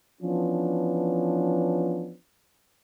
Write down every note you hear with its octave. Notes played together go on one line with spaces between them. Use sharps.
E3 F3 B3 C#4 D4